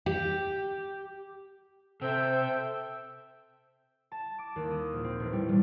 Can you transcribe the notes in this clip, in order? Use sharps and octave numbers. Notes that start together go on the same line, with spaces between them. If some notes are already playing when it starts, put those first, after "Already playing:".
G4
C3 A4 C5 E5 G5
A5
D6
D#2
D#6
A#1
C4
A1
G3
E1